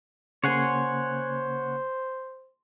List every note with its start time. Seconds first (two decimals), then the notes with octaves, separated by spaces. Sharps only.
0.44 C#3 A#3 C5 C#5 F#5 G#5 C6 C7